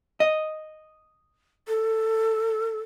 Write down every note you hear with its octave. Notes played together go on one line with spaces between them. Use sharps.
D#5
A4